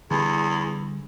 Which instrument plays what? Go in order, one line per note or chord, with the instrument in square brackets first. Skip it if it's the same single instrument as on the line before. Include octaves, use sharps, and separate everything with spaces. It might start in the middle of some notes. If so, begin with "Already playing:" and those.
[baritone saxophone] E2 [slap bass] D3 G3